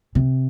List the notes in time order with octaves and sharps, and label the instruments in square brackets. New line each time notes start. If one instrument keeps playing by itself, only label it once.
[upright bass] C3